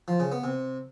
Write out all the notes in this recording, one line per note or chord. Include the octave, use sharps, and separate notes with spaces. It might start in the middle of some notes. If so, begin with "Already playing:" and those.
F3
C#3
B3
C3